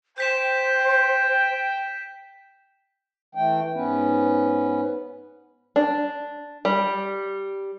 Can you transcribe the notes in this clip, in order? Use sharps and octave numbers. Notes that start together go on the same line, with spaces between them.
C5 G5 G6 B6 E7
E3 A3 G5
G#2 B3 C#4 B4
D4
G3